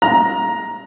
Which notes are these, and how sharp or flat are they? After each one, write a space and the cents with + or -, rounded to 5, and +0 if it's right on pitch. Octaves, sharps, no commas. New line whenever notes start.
A#5 +10